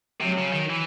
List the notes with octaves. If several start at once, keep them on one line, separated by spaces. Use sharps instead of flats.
C3 F#3
C#3
D#3
E3